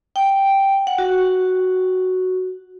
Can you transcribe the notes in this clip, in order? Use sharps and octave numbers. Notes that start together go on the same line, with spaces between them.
G5
F#5
F#4